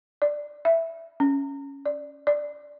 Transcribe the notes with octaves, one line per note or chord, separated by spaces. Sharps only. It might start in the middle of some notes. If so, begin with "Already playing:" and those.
D5
E5
C#4
D5
D5